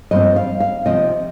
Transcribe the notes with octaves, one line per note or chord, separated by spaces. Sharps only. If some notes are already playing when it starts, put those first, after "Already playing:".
G2 F3 C4 D#5
F5
F5
C3 F3 C4 D#5